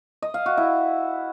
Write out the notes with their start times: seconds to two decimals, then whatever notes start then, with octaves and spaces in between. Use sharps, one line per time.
0.22 D#5
0.34 F5
0.46 F#4
0.57 E4